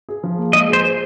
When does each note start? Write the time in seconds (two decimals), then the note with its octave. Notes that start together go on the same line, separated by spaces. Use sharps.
0.09 G#4
0.24 F3
0.38 A#3
0.53 G#3 D#5
0.68 G#4
0.73 C5
0.84 C5